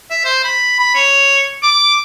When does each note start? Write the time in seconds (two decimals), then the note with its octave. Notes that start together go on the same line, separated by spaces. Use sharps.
0.10 E5
0.25 C5
0.44 B5
0.79 B5
0.95 C#5
1.63 D6